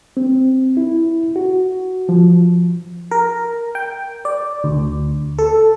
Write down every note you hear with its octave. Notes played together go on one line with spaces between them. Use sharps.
C4
E4
F#4
F3
A#4
G5
D5
D2
A4